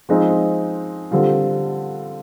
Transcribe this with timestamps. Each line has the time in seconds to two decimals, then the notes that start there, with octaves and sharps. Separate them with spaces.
0.09 F3 G#3 C4 D#4
1.11 D3 G3 C4 F4